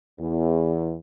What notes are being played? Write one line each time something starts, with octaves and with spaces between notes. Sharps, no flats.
E2